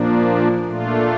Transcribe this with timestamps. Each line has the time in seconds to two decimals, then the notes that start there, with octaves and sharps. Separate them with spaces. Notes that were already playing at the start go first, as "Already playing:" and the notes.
Already playing: A#2 F3 A#3 D4
0.65 A#2 A3 D4 F4